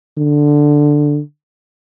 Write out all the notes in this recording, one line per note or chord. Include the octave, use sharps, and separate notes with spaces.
D3